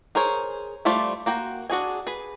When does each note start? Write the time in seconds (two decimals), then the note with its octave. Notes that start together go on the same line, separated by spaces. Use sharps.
0.15 G#4 A#4 C5 C#5
0.85 G3 A3 F4 C5 D5
1.26 A#3 F#4 G5
1.70 D4 F#4 G#4 G#5
2.07 G#4 B4